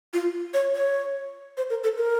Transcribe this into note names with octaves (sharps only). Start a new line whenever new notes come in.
F4
C#5
C#5
C5
A#4
A4
A#4